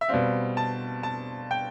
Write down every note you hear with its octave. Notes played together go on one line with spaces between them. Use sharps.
E5
B2 G3 C4 F5
A5
A5
G5